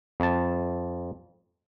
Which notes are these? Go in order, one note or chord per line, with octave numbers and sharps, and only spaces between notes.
F2 A5